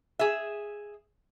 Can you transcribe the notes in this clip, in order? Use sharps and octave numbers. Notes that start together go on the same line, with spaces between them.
G#4 E5